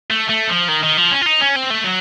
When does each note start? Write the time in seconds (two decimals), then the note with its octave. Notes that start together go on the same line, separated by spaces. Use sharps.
0.10 A3
0.30 A3
0.49 F3
0.69 D#3
0.83 D#3
0.98 F3
1.12 C#4
1.22 F4
1.26 D#4
1.41 C#4
1.56 C4
1.70 A3
1.84 F#3